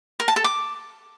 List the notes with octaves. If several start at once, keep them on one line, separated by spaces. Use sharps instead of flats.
A#4
A5
A4
D6